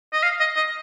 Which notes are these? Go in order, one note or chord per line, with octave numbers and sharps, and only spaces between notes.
D#5
F5
D#5
D#5